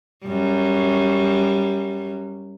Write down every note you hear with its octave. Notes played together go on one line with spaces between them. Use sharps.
F#2 G3